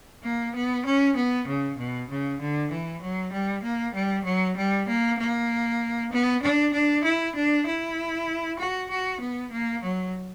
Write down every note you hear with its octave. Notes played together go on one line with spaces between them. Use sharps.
A#3
B3
C#4
B3
C#3
B2
C#3
D3
E3
F#3
G3
A#3
G3
F#3
G3
A#3
A#3
B3
D4
D4
E4
D4
E4
F#4
F#4
B3
A#3
F#3